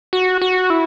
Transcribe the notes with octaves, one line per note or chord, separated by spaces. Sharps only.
F#4
F#4
E4